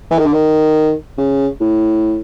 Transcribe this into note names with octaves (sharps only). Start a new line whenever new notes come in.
E3
D#3
D3
D#3
C#3
A2